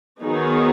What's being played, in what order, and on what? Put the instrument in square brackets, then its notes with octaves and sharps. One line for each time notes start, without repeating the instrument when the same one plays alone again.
[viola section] D#3 F#3 B3 D#4 G#4